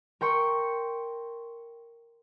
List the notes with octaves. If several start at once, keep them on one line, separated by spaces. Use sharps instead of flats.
A#4 G5 C6 C#6